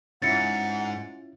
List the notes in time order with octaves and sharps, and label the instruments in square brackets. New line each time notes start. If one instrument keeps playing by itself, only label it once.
[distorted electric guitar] G#2 [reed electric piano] C#4 E4 F4 [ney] F#5 [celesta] A6 C#7